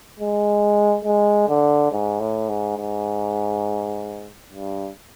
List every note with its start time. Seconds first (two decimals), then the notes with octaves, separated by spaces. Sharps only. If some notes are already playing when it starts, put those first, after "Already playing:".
0.19 G#3
1.05 G#3
1.48 D3
1.92 G#2
2.20 A2
2.49 G#2
2.77 G#2
4.50 G2